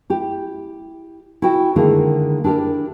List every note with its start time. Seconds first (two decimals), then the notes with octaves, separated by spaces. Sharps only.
0.10 E4 G4
1.42 E4 F#4 G5
1.76 D3 D#3 G#3 A#3 E4
2.44 D4 E4 G4 A#4